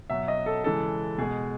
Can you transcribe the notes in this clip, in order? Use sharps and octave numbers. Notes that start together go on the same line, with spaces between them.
B2 F#3 E5
D#5
A4
C#3 E3 G#3 A4
B2 G#3 G#4